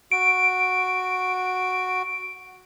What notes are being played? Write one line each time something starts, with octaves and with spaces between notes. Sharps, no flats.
F#4 D7